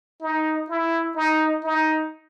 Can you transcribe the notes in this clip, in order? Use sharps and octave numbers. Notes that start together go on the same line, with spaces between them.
D#4
E4
D#4
D#4